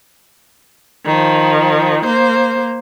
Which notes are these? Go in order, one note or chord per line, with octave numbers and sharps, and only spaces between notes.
D#3 F3
A#3 C5